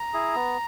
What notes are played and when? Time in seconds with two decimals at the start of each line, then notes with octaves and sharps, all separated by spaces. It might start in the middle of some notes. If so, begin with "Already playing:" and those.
Already playing: A#5
0.13 E4 G#4
0.35 B3